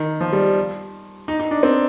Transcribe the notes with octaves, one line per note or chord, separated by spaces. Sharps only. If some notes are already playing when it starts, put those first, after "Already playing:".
Already playing: D#3
F3
G3
D#4
D#4
D4
C4